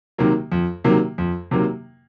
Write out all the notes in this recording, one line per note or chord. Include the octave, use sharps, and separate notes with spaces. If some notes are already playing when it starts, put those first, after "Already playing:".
C3 D#3 F#3 A#3
F2
C3 D#3 F#3 A#3
F2
C3 D#3 F#3 A#3